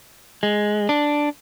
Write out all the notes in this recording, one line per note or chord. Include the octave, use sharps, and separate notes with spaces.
G#3
D4